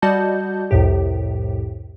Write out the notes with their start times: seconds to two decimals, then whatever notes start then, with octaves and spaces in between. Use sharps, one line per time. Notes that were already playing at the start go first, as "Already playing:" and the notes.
0.02 G3 F#4 D5 D#5 A5 G6
0.71 C2 F2 A2 G4